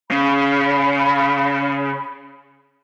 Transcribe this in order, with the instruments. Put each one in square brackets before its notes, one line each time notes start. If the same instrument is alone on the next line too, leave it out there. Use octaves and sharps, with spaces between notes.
[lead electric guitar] C#3 [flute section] B5